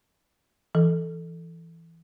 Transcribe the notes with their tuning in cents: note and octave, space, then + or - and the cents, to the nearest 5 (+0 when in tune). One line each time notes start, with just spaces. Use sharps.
E3 +5 A4 +0